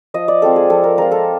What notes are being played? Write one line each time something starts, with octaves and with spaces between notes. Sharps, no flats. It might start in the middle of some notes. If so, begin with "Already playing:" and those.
F3 D#5
D5
G#3 C4 F4 A4
G#4
F3 A4
A#4
G#3 C4 F4 A#4
A4